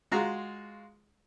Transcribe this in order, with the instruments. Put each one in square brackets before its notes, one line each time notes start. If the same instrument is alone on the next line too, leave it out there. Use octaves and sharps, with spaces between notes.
[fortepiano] G#3 F4 F#4 A#5